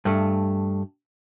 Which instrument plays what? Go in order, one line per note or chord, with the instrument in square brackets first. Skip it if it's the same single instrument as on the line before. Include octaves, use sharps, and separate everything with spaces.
[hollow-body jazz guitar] G2 A3